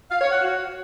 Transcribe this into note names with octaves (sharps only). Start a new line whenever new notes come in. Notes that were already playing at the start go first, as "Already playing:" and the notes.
F5
C#5
F#5
F#4